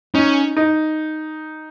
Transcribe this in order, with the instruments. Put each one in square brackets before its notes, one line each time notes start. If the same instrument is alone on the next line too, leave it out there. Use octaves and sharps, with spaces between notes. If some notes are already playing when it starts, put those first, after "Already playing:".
[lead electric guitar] C#4 [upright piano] D#4
[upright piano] D#4